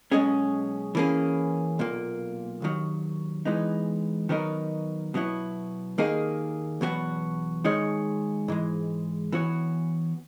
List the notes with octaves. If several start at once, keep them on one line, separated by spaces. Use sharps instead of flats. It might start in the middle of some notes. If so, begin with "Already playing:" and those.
B1 B2 G#3 C#4 G#4
E3 A#3 C#4 G#4
B1 A#2 A#3
D#2 D#3 F#3
E3 G#3 B3 D#4
D#3 F#3 B3 D#4 A#4
B2 F#3 B3 E4
D#2 D#3 A#3 D#4 G#4
E2 B2 F#3 B3 F#4
D#3 G#3 D#4 G#4 C#5
G#2 E3 G#3
E3 B3 F#4 C#5